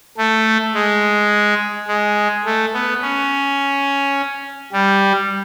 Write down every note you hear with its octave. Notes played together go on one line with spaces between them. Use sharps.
A3
G#3
G#3
A3
B3
C#4
G3